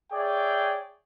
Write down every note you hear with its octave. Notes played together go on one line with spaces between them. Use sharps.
G#4 C#5 D5 E5 G5